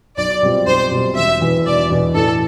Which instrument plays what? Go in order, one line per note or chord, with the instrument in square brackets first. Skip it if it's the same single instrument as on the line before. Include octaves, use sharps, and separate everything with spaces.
[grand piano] B1 [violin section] D5
[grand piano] B2 G3 C4 F4
[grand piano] B1 [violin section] C5
[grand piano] B2 G3 C4 F4
[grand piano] E1 [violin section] E5
[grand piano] E2 B2 B3
[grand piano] E1 [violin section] D5
[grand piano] E2 B2 B3
[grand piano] A2 [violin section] A4